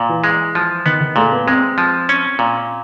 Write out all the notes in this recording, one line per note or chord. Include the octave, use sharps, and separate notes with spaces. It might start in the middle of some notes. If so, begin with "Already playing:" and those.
Already playing: A#2
E3
G#3
F3
D#3 B3
D#3
A#2 A3
B3
G#3 C4
F3
C#4
A#2